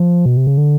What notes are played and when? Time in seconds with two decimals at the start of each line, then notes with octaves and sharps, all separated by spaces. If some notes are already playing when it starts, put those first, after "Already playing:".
Already playing: F3
0.26 B2
0.37 C3
0.47 C#3
0.58 D3